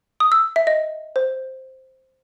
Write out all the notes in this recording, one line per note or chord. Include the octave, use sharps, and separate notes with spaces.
D#6
E6
E5
D#5
C5